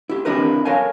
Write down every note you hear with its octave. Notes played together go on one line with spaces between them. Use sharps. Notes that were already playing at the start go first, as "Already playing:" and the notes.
E4 G4
C4 D4 E4 G4 A#4 B4
A4 A#4 C#5 F5 G#5